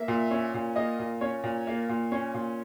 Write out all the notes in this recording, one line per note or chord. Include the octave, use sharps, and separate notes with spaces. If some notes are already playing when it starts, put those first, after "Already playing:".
Already playing: A#3 E5
A#2
C#4
A#2
A#3 D#5
A#2
C#4 C#5
A#2
A#3
A#2
C#4
A#2